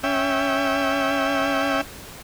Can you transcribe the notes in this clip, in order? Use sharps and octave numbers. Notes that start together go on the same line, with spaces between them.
C#4 E5 G5